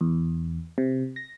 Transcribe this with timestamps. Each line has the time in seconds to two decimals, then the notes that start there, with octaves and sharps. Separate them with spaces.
0.01 E2
0.78 C3
1.16 A#6